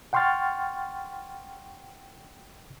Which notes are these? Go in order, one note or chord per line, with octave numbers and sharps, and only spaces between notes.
F#5 G5 C6 C#6 F6 A6